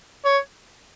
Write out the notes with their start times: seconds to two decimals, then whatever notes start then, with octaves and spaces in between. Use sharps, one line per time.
0.24 C#5